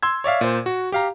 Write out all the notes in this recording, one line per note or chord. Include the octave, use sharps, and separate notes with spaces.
C6 E6 G#6
C#5 D5 E5 F5
A#2 C5
F#4
G4 F5 A#5